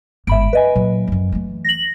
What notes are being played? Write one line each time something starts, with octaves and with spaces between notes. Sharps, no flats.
G1 G#2 E5 B5 D7
F#3 B4 D#5 G#5
A#2 F#3
F#2 F3
E3 A3
A#6 F#7